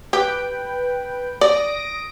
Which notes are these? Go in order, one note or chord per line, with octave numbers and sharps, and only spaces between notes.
G4 B4 G5
D5 D#6 A#6 D7